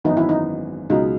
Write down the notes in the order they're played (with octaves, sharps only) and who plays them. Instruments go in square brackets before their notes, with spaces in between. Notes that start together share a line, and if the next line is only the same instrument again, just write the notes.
[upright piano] G#1 F#2 E3 B3 [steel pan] D#4
[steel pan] E4
D#4
[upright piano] C#2 B2 F#3 [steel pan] D#4